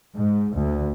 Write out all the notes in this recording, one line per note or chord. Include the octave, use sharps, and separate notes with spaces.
G#2
D2